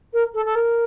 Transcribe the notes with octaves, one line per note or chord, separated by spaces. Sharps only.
A#4
A4
A4
A#4